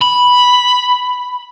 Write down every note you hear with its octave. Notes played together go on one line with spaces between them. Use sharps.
B5